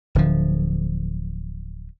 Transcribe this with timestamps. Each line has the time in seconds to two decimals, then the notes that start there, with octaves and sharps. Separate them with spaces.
0.15 D1 D3 F3